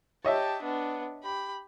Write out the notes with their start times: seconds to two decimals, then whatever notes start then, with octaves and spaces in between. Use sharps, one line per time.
0.25 G4 C#5 D#5 E5 A5
0.62 B3 D4
1.23 G4 B5